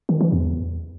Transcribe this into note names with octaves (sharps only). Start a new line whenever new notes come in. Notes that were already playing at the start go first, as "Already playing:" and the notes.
D#3
E3
E2